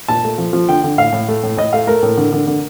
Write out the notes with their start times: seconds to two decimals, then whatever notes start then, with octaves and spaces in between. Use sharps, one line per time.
0.08 A#2 A5
0.24 A3
0.38 F3
0.53 F3
0.69 D3 G5
0.84 D3
0.98 A2 F5
1.13 A2
1.28 A3
1.43 A2
1.57 A2 D#5
1.73 A3 F5
1.87 A3 A#4
2.03 A2
2.17 D3
2.32 D3
2.47 D3